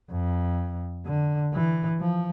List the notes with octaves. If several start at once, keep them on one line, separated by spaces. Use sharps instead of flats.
F2
D3
E3
F3